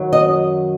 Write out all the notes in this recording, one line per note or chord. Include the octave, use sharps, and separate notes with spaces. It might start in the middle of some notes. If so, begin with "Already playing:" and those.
Already playing: F#2 D#3 F#3
D#5